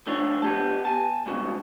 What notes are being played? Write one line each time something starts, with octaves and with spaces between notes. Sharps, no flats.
F3 A3 D4 F4 C#5
B3 G4 A5
G#5 A5
C#2 G2 B2 F#4